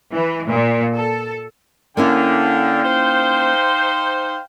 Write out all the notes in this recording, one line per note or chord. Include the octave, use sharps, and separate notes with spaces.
E3
A#2
A4
D3 A#3 C#4 E4 F5 G5
D#4 C5